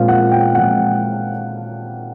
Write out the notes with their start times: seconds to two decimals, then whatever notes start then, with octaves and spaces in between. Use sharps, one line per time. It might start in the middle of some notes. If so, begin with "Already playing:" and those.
Already playing: A#2 F3 G#3 C4 F5
0.08 F#5
0.32 G5
0.55 A#2 F3 G#3 C4 F#5